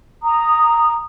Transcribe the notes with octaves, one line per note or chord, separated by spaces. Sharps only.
A#5 D#6